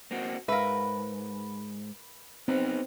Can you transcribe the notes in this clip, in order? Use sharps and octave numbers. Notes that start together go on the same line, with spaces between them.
A#3 C4 F#4
G#2 A#4 B4 E5 F5
B3 C4 D#4 B4